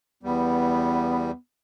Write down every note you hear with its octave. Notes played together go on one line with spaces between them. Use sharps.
E2 G3 B3